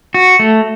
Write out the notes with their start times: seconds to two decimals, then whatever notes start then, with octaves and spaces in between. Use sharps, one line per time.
0.14 F#4
0.39 A3